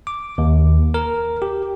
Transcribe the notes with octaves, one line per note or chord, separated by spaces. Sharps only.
D6
D#2
A#4
G4